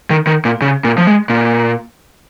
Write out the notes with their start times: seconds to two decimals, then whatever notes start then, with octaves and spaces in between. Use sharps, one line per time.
0.10 D#3
0.27 D#3
0.45 A#2
0.62 C#3
0.84 A#2
0.98 F3
1.07 G#3
1.30 A#2